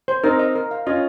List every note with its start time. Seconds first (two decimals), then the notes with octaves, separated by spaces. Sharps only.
0.08 C5
0.24 C4 D#4 A#4
0.39 D#5
0.55 A#4
0.71 F5
0.86 C#4 F4 D#5